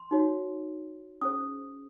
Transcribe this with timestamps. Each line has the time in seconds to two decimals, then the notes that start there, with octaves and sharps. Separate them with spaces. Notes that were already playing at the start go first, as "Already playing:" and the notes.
Already playing: C6
0.11 D#4 F#4 C#5
1.21 C#4 G#4 C5 D#6